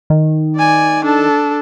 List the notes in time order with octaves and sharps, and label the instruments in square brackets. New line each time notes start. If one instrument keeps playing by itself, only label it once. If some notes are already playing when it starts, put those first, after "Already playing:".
[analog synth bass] D#3
[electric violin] D5 G#5
D4 A4